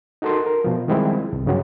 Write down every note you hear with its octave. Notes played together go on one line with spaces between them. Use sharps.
D#4 F#4 A4 A#4 C6
A#4
B2 F3
D#3 F3 G3 G#3 C4 E4
C2
G2 C#3 F3 F#3